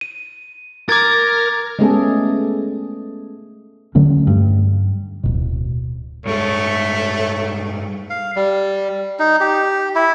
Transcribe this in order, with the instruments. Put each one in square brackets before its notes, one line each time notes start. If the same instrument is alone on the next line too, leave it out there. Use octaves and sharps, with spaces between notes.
[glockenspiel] D#7
[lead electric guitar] A#4 [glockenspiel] D6 G#6 A6
[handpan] G#3 A3 B3 C#4 G#4 A4
[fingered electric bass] D3 F#3 A3 C#4
G2
D1 G#1 B2
[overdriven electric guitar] G2 G#3 [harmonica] A3 [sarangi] C#5
[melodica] F5
G3
D#4
G4
E4